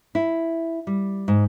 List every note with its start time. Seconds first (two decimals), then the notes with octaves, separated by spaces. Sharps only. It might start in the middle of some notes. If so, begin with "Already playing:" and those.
0.15 E4
0.87 G3
1.28 G#2